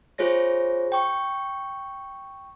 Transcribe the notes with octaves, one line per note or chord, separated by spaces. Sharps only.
F4 G#4 C5 C#5 A#6
G5 C#6